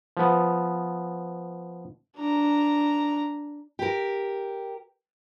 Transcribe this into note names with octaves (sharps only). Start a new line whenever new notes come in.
F3 B3
D4 A#5
G4 A#4